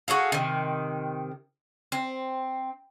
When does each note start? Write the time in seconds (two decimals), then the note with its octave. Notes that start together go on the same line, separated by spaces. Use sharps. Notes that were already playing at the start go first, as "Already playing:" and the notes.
0.08 F#4 G#4 A4 F5
0.32 C3 D#3
1.92 C4